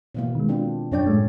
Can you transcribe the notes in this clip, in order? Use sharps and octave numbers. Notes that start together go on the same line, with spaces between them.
B2 E3 A#3
D#3 G#3
C4 D4 F4
F#2 C#4 D4 C#5 D5 G5
A2 G#3 A3